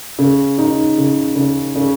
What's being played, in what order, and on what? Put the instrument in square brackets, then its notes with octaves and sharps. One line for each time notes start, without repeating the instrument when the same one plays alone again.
[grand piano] C#3
D#4
C#3
C#3
C#3